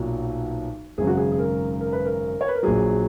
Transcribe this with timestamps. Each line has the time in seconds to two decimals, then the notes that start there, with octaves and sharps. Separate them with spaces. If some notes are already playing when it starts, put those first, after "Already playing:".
Already playing: B1 A#2 F#3 F#4
0.98 G#1 F#2 C#3 G#4
1.07 F#4
1.17 G#4
1.32 G#4
1.39 A#4
1.81 A#4
1.92 B4
2.05 A#4
2.41 C#5
2.48 B4
2.55 A#4
2.63 A#1 A#2 F#3 G#4